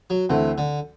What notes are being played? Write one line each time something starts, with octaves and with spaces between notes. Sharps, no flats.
F#3
D2 D3 E3 A3 C4 E4
D3